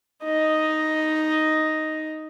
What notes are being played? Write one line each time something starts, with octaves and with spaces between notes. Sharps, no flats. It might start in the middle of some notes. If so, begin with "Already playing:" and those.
D#4 D#5